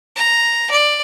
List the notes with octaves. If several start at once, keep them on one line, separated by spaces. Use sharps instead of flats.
A#5
D5